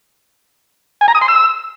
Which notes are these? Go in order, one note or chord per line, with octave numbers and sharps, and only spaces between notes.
G#5
A#5
D#6
C6
E6